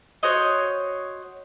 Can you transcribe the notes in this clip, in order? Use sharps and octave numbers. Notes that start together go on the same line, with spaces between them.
F#4 C5 C#5 D#5